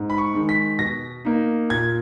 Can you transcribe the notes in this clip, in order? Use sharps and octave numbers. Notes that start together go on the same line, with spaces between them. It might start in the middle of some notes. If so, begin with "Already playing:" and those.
Already playing: G#2
B5
C#6
D#3 G#3
B6
B2 A#6
A#3 D#4
A#2 G#6